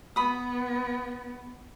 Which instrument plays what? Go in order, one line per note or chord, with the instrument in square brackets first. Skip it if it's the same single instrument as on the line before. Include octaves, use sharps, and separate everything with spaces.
[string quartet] B3 [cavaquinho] B5 D#6